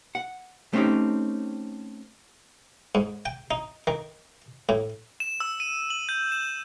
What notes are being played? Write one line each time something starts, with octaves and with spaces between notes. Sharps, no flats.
F#5
A3 C4 C#4 D#4 G4
G#2
G5
D#4
D#3
A2
E7
E6
D#7
F#7
G6
E7